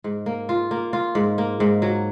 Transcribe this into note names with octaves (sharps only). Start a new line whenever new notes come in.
G#2
A#3
F4
A#3
F4
G#2
A#3
G#2
F#3